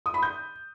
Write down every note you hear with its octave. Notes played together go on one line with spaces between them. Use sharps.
D#6
B5
G6